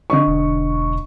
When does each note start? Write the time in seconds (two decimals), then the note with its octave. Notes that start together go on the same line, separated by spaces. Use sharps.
0.10 D3 D#5 C#6
0.27 E1